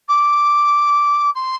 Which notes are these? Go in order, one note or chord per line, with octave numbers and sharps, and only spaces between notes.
D6
C6